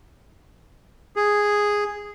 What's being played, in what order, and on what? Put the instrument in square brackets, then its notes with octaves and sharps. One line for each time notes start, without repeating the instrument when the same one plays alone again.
[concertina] G#4